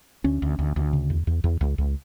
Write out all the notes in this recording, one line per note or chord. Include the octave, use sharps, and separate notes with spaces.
D2 C#4
D2
D2
D2
C#3
E2
E2
E2
C#2
C#2